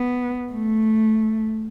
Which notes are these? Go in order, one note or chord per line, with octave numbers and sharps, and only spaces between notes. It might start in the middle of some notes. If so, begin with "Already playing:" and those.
Already playing: B3
A3